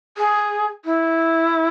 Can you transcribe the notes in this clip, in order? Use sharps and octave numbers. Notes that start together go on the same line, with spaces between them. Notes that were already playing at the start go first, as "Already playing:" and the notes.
G#4
E4